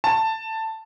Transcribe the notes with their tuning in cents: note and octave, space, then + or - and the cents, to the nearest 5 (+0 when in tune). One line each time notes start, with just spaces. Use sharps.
A5 +10